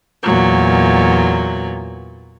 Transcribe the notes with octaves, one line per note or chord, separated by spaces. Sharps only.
E2 A#2 F#3